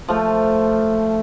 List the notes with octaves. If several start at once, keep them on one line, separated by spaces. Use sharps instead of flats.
F3 A3